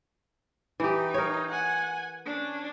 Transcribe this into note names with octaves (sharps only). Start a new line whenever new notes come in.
E3 D#4 G4
A#4 C#5
F#5 G#5
C#4 D4